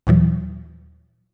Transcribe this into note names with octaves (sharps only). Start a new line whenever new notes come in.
D#2 A#2 E3 F#3